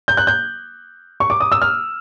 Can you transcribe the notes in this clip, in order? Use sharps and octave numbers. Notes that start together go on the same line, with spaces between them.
G6
F#6
G6
C#6
D6
D#6
E6
F6